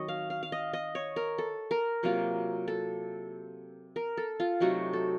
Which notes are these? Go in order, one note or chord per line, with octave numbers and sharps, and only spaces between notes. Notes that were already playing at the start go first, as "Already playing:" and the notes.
Already playing: D#3 F#3 C4 C#5 D#5
F5
F5
F5
D#5
D#5
C#5
A#4
A4
A#4
C3 F#3 A#3 F4
A4
A#4
A4
F4
C3 F#3 A3 D#4 F#4
A4